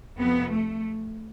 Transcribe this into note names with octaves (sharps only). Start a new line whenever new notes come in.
F2 C3 F3 B3
A3